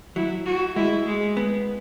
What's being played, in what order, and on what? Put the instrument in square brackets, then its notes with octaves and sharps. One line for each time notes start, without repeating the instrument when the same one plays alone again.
[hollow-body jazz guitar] F#3 [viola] E4
[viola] F#4
[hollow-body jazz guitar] G#3 [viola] E4
[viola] G#3
[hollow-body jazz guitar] B3